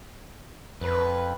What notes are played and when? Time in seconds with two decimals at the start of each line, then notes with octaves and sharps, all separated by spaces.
0.81 F2 B4